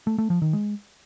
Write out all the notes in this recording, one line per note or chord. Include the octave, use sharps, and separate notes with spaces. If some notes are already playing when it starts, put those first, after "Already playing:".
A3
A3
F3
D#3
G#3